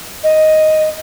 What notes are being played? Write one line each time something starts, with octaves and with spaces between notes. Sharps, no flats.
D#5